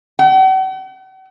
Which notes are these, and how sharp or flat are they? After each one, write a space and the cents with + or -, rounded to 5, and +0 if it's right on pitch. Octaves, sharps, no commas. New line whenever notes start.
F#5 +45